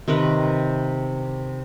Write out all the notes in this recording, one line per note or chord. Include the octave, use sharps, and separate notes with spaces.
C3 D#3 A#4 B4